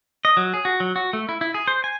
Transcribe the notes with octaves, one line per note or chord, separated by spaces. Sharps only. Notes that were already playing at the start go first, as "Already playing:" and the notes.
D#5
F#3
G#4
F#4
F#3
F#4
A3
E4
E4
G#4
C5
G#5